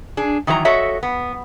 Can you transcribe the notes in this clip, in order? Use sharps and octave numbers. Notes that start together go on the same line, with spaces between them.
D4 G#4
D#3 E3 F#3 B4 A#5
F#4 A4 C#5 D#5 E5
B3